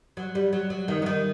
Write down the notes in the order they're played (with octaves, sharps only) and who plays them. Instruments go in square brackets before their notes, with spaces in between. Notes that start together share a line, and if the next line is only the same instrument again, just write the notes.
[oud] F#3
G3
F#3
F#3
D#3
F#3
D#3